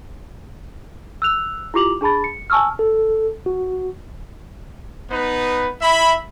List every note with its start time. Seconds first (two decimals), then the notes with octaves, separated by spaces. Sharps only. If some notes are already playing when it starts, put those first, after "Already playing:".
1.22 E6 F#6 F7
1.74 E4 F4 G4 D6 F7 F#7
2.01 D4 G#4 A5 B5 A6
2.24 C#7
2.50 G#5 A5 C#6 E6 F6
2.79 A4
3.46 F#4
5.11 B3 D#4 B4
5.81 E4 E5 B5